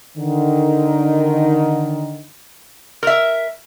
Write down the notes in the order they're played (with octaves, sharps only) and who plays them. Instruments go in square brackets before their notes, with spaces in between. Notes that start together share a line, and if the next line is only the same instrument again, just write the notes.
[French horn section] D3 D#3
[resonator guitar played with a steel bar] A#4 E5